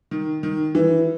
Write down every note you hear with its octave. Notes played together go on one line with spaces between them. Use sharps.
D#3
D#3
E3